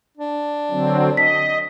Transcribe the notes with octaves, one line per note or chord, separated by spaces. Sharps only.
D4
D3 F#3 C4
D#5 B6